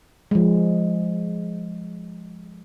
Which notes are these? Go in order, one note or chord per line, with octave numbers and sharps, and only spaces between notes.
F3 G#3